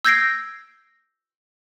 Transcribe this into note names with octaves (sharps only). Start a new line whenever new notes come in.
E6 G6 G#6 A#6 C7 D7